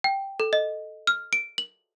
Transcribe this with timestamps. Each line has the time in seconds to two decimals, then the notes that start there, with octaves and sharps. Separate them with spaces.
0.04 G5
0.40 A4
0.53 D#5
1.07 F6
1.33 D7
1.58 F#7